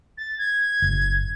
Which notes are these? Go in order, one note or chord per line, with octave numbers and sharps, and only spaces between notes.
A6
G#6
F#1